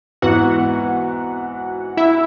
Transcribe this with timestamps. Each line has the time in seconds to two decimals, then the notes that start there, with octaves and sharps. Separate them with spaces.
0.22 G#2 E3 B3 F#4 F#5
1.97 E4 E5